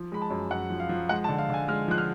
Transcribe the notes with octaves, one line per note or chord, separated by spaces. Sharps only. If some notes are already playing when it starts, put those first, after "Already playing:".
Already playing: F3
G#3 B5
A5
F#2
F#2 F#5
F3
F5
F3
G#3 F#5
A5
D3
F5
D3 G#5
G#3 F6
F3 F#6
F6